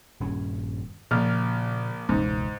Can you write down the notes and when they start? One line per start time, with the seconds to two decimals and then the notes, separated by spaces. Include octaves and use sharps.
0.20 D#1 G2 C#4
1.11 A#1 A#2 C#3 F6
2.09 E1 C#2 G#2